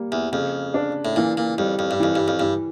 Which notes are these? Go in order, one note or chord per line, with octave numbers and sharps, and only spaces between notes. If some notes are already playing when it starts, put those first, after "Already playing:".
Already playing: G3 A#3
E2
F2 C#3
D4
A2
A#2 E3
A#2
F2 G3
F2
G2
F2 E3
G2
F2
G2 E3